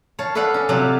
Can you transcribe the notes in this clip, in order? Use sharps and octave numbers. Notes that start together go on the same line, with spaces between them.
C#5 F5 A5
A4 B4 D5 F5 F#5
C#4
C3 F#3 F4 G4 D5 F#5